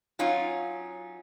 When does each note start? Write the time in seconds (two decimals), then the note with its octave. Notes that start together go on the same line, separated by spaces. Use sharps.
0.19 F#3 C#4 D#4 F4